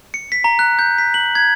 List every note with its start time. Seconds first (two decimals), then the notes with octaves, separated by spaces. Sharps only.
0.14 C#7
0.32 B6
0.44 A#5
0.59 F#6
0.79 G6
0.98 B6
1.14 F#7
1.35 G#6